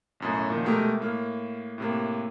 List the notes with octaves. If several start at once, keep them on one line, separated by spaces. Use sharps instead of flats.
B1 F#2 A2
A#2 D#3 F3
B2 G#3 A3 G4 A#4
A2 A#3 F6
A2 C3 A#3